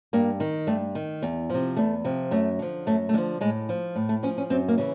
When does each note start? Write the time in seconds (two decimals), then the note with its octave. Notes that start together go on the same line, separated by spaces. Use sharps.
0.13 G2 A#3
0.40 D#3
0.67 G2 A3
0.95 D#3
1.22 E2
1.50 C3 F3
1.77 E2 A3
2.04 C3 F3
2.31 F#2 A3
2.59 D3 F3
2.86 F#2 A3
3.09 A3
3.13 D3 G#3
3.17 F3
3.41 A2 G#3
3.69 F3
3.96 A2
4.09 A3
4.23 F3 C#4
4.38 C#4
4.50 F#2 C4
4.68 A#3
4.78 C#3 E3